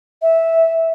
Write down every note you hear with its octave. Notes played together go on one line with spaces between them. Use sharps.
E5